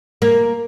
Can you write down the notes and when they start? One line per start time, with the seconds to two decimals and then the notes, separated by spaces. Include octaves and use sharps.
0.22 A#3